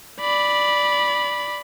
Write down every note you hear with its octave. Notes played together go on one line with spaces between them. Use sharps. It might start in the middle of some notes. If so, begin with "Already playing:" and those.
D5 B5